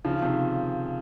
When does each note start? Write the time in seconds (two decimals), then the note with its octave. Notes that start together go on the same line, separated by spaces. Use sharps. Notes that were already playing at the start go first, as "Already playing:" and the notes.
0.05 C#3 F3
0.22 C3 D#3